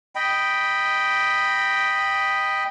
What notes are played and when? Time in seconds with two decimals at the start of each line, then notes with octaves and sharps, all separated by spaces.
0.15 D#5 G5 B5